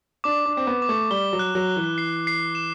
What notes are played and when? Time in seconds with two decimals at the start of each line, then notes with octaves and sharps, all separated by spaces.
0.24 D4 D6
0.46 D4
0.53 C4 D6
0.67 B3
0.82 D6
0.89 A3
1.10 G3 G7
1.33 F#3
1.39 F#6
1.55 F#3
1.69 F#6
1.76 E3
1.98 C7
2.27 C7
2.55 E7